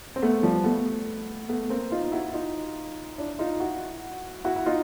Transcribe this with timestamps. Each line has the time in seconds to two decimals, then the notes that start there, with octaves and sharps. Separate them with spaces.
0.16 C4
0.22 A3 B3
0.43 F3 G3
0.64 A3 B3
1.49 A3 B3
1.70 A#3 C4
1.91 D#4 F4
2.12 E4 F#4
2.33 D#4 F4
3.18 D4 E4
3.39 D#4 F4
3.60 E4 F#4
4.44 E4 F#4
4.56 E4
4.66 D#4 F4